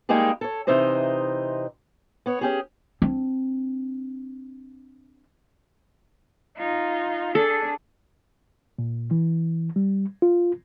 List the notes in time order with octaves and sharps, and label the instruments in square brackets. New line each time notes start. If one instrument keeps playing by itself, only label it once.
[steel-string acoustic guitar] G3 G#3 A#3 D#4 G4 G#4
A4 C#5
C3 E3 D#4 C5 D#5
B3 C#5
C#4 G4 G#4
[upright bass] C4 D4
[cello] D#4 F4
[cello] D4 G#4 [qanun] A4
[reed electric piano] A#2
E3
G3
F4